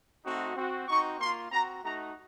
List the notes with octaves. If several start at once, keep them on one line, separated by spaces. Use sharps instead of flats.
A3 C4 D#4 F#4
C4 F#4
C4 D#4 F#4 C#6
A#3 F4 C6
C4 F#4 A#5
A3 D#4 F#4 A#5